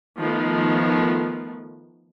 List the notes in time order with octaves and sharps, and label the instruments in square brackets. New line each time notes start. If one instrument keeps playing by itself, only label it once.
[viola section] D#3 F3 A3 B3